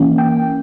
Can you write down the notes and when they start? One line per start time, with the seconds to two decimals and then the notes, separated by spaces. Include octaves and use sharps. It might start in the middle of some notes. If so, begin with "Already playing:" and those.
Already playing: E3 A#3 C#4
0.18 G5